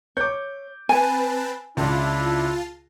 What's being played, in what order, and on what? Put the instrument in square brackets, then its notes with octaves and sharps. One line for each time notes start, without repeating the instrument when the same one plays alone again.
[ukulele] C#5 [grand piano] D6 G6
[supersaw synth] C4 B4 A5 [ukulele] G#5
[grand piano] C#2 [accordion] D4 E4 [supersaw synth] F4 A5